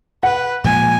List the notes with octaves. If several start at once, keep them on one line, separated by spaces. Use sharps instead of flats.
B4 F#5
A#2 F3 G#3 G#5